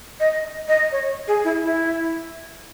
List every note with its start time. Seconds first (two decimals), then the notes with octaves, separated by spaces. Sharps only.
0.20 D#5
0.68 D#5
0.92 C#5
1.28 G#4
1.44 E4
1.63 E4